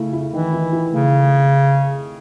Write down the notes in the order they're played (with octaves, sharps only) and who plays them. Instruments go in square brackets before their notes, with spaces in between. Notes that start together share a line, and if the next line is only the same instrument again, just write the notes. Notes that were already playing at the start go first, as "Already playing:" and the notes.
Already playing: [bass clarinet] C#3 [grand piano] A3 E4
[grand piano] E4
[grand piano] D#3 [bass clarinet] E3
[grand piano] E4
E4
[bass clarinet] C#3 [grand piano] A3